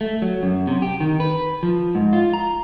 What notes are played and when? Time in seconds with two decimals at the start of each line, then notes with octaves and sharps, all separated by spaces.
0.01 A3
0.22 F#3
0.43 F#2
0.67 C3
0.82 G4
1.00 D#3
1.20 B4
1.63 F3
1.95 G#2
2.13 F4
2.33 A#5